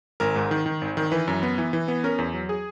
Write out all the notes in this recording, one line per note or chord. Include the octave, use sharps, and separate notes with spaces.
G#1 A#4
G#2
D#3
D#3
G#1
D#3
E3 B4
F#2
B3
E3
E3
B3
C#4 A#4
E2
F#3
G#4